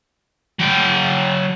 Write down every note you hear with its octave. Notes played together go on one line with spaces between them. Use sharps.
F#3 G5